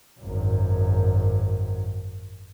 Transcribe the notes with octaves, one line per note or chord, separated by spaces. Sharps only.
G#1 F#2